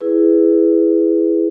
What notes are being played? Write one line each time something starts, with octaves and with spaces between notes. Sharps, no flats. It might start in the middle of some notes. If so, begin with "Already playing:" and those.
E4 G#4 B4